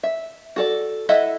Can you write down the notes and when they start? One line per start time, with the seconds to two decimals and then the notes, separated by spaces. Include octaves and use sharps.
0.03 E5
0.56 F#4 A4 D5
1.09 E4 A4 D#5 E5 F#5